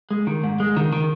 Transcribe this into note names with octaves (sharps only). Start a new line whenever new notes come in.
G#3
D#3
G#2
G#3
D#3
D#3